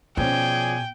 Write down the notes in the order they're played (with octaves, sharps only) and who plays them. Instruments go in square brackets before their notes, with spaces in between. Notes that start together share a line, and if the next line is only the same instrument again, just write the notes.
[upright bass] B2 [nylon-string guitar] F3 C#4 [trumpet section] G#4 D5 G#5 [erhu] G5